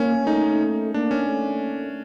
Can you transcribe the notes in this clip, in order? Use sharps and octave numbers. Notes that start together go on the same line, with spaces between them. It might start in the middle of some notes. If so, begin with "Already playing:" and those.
Already playing: A#3 C#4
A3 D#4
A#3 D4
C#4
A3